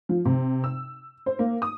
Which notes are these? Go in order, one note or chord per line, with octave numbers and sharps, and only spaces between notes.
F3
C3
E6
C5
A#3
D#6